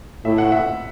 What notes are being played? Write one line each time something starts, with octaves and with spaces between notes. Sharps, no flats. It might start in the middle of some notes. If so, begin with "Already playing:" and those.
A2 E5
F#5
E5